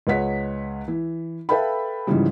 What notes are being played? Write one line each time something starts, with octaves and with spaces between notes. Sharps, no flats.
C#2 G#3 B4 C#5 F#5 B6
E3
A4 B4 E5 F5 G5 B5
G#2 C#3 E3 F3 G3